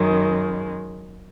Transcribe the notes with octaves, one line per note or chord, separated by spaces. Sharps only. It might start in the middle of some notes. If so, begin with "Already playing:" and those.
Already playing: F#2 D#3 G#3